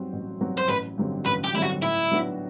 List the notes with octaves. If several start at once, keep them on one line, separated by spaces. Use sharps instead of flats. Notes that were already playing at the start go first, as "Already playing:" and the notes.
Already playing: G2 F#3 C4 F#4
A1
G2 F#3 C4 F#4
C5
A1 B4
G2 D3 F#3 C4
A1 B4
G4
G2 D3 F#3 C4 E4
F#4
A2 E4
F#3 B3 D4 F#4